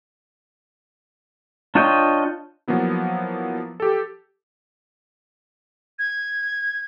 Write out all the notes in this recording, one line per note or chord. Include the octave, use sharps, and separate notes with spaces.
D4 F4 C#5 D#5 G5
F3 F#3 A#3 B3 E4
G4 A4
G#6